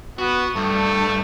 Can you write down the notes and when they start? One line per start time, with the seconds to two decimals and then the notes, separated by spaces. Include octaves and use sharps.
0.19 B3 F#4
0.56 G2 A3